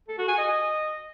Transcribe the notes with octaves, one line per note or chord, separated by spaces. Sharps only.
A4
F#4
G#5
D#5